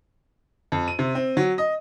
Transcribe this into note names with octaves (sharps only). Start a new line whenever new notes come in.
F2
D#7
C3
C4
F#3
D#5